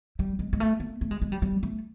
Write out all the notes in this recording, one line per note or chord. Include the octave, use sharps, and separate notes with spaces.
G3
G#3
G#3
A3
A#3
A3
G#3
G#3
G3
G3
A3